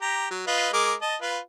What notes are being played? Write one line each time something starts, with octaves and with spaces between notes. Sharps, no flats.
G4 A#5
F#3
F4 B4 D#5
G#3 A#4 D6
D#5 A5
F4 B4